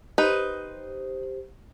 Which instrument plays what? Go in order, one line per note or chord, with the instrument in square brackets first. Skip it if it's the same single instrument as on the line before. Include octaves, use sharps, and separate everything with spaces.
[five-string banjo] D#4 B4 [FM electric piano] G4 C5